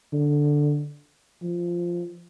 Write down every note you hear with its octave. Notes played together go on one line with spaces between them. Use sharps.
D3
F3